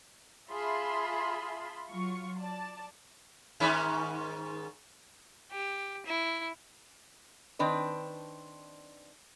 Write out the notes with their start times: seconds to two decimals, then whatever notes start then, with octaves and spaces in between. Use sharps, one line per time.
0.51 F4 G#4 E5 A5 B5 C6
1.89 F#3 F4 C#6
2.39 D5 A5
3.60 G#2 D#3 C#4
5.52 G4
6.06 E4
7.59 D#3 C4 D4 B4